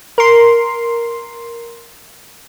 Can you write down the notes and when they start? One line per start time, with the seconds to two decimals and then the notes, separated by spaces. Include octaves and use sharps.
0.18 A#4 C6